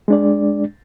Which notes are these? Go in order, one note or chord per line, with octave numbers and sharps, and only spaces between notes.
G#3 D4 D5